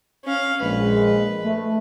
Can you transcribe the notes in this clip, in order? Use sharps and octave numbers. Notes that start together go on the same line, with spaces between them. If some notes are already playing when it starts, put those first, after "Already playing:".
C#4 F5
A#1 G#3 B4
A3